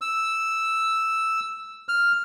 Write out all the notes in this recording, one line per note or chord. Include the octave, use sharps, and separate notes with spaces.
E6
F6